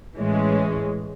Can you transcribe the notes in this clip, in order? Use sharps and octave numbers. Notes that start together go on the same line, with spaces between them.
A2 E3 G#3 C#4